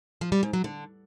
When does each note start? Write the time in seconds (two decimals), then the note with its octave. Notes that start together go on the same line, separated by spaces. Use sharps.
0.21 F3
0.32 G3
0.43 G#2
0.53 F#3
0.64 D3